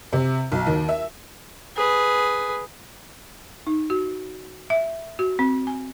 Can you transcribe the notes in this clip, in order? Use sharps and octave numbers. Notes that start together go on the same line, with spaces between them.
C3
B1
D#2
E5
G#4 B4
D#4
F#4
E5
F#4
C4
G#5